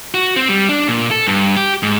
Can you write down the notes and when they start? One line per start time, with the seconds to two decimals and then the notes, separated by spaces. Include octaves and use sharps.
0.14 F#4
0.36 C4
0.49 G3
0.69 D4
0.88 A#2
1.11 A4
1.27 G2
1.57 G4
1.83 G#2